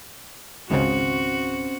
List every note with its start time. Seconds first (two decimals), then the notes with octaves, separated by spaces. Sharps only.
0.70 G#1 C#2 C#3 C4 C#4 F#4 C5